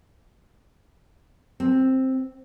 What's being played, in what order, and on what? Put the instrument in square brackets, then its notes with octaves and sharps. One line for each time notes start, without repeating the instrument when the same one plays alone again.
[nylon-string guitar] C4